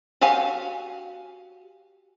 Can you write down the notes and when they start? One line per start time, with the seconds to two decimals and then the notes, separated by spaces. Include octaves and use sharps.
0.21 F#4 G4 F5 G#5